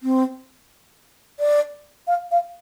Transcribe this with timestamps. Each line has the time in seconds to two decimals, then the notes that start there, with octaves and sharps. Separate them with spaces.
0.03 C4
1.40 D5
2.07 F5
2.31 F5